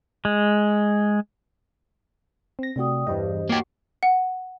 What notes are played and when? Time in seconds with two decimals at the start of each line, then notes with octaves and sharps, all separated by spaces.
0.25 G#3
2.59 C4 A#6
2.76 C3 A3 F#4 D5 G5 D#6
3.07 E2 G2 G4 C5 D#5
3.49 A#3 F#4 G4 C#5 F#5 C7
4.03 F#5